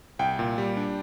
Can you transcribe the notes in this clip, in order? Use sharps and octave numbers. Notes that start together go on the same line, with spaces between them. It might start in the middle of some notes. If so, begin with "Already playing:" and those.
C2 G5
A#2
G3
D4